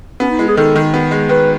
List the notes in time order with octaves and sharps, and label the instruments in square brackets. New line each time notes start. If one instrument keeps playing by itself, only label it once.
[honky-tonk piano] B3 [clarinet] C#4
[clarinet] D#4
[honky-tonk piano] G#3 [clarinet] E4
[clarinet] G#4
[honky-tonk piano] D#3 [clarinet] A4
[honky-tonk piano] D#3
B3
G#3
[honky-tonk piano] D#3 [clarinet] B4